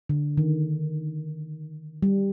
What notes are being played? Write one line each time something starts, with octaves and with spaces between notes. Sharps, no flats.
D3
D#3
G3